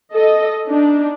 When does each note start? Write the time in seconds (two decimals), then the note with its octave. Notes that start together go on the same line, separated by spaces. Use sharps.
0.14 A4 D#5
0.68 D4 D#4